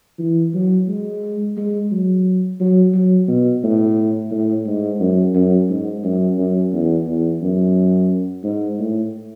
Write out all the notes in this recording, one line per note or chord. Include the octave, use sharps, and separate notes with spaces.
E3
F#3
G#3
G#3
F#3
F#3
F#3
B2
A2
A2
G#2
F#2
F#2
G#2
F#2
F#2
E2
E2
F#2
G#2
A2